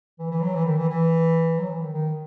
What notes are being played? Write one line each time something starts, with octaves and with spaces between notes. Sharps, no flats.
E3
E3
F#3
E3
D#3
E3
E3
F#3
E3
D#3
D#3